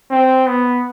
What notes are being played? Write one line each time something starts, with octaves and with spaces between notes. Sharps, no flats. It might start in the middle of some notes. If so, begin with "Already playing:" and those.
C4
B3